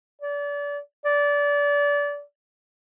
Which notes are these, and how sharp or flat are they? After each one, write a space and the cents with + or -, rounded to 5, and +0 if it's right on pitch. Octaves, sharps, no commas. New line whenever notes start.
D5 -35
D5 -25